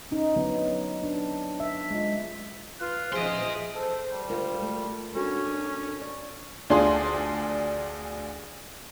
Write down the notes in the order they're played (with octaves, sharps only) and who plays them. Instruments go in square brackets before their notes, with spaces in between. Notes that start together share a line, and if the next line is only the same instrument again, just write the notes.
[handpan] C#4 D#4
D3 F#3 B3
D4
E5
G#3 F4
[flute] F4 [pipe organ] B4
[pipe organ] F3 [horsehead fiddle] G#4 D#5 [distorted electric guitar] E5 C6
[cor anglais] A4 [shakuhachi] C5
[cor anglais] G3
[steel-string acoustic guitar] D2 A#4 A#5 [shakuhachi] F4
[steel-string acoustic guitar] A3 A#4
[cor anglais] C#4 [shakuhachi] D4 [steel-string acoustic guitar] F#4 A4 A#4
[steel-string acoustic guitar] D5
[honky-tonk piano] D2 D4 F4 G#4 C6